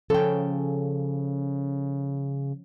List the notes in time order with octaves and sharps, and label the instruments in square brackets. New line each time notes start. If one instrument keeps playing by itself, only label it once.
[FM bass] C#3 [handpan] F3 C#4 [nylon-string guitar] A4 G5